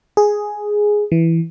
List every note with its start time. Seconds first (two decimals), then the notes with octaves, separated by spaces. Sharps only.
0.17 G#4
1.12 E3